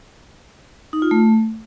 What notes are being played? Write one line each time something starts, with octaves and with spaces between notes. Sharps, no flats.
D#4
F4
A3